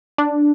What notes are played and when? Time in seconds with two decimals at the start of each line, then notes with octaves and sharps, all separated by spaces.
0.18 D4